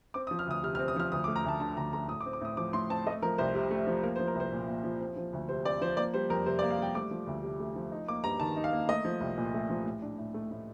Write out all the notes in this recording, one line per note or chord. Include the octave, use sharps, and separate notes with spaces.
C4 D6
D#6
F3
F6
D2 D#6
C3 F6
F6
C4
D#6
F3 F6
D2 D#6
D6
A3
A#5
D2 A5
D3 A5
D2 A#5
A3 A#5
A2 D#6
D6
C4
D6
A2 D#6
F3 D6
A2 C6
C4 A5
A3 D#5
F3 A#4
C2 C5
C3
A3
F3
A#3 A#4
C5
F3
A#4
C2 C5
A#2
A#3
F3
C4
F3
D2
C3 C5
C4 D5
F3 C5
A#3 D5
G3 C5
F2 A#4
C3 C5
D5
A#3
F5
G3 G5
A3 D6
F3
D2
C3
A3
F3
D#4
A#3 D6
G2 A#5
D#3 A5
D#4
F5
A#3
A3 D#5
F3
C2
A#2
A3
F3
A2
D4
A2
A3
A2